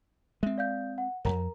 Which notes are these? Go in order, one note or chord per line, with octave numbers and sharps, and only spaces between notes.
G#3 C4 E5
D5 F5 G6
F#5
E1 F2 A#4 A#5